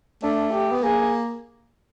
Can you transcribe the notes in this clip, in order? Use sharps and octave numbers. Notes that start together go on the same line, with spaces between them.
A3 D4
G4
B3
A#3 G#4